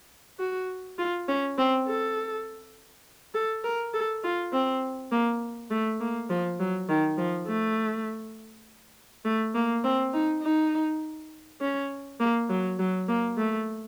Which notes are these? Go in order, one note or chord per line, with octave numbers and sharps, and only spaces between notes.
F#4
F4
C#4
C4
A4
A4
A#4
A4
F4
C4
A#3
A3
A#3
F3
F#3
D#3
F3
A3
A3
A#3
C4
D#4
D#4
C#4
A#3
F#3
F#3
A#3
A3